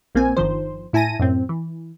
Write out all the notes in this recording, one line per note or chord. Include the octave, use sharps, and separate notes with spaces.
A#1 A#3 C4 G#5
G1 D#3 F3 C5
A2 E4 G#5 A5 A#6 D#7
F#2 A2 C4
E3